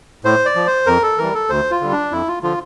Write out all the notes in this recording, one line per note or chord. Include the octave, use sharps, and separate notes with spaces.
A2 C5
D5
F3
C5
F2 A#4
A4
E3 G3 A#4
A4
D2 C5
F4
D3 G3
D4
F2 E4
F4
D3 F3 F4